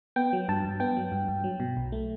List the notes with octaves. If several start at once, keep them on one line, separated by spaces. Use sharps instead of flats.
B3 G5
F#3
G2 A5
G2
B3 G5
F#3
G2
G2
F#3
B2
B1
A3